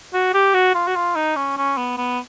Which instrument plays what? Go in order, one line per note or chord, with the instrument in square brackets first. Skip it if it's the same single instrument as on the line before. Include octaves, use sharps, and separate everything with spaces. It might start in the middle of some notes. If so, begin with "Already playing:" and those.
[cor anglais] F#4
G4
F#4
F4
F#4
F4
D#4
C#4
C#4
B3
B3